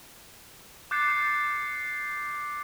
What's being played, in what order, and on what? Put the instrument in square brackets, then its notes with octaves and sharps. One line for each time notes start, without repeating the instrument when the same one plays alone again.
[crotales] D6 F#6 G6 A6 C7 C#7